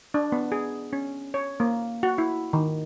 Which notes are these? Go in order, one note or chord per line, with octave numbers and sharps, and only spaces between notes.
D4
B3
G#4
C#4
C#5
A#3
F#4
E4
D#3